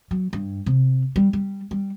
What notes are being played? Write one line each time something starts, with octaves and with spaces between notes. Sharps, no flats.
F#3
G2
C3
G3
G3
G3